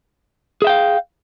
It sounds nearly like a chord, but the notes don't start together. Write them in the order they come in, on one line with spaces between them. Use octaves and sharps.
G#4 E5 G5 F5